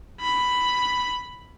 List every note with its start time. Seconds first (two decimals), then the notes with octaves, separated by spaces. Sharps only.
0.20 B5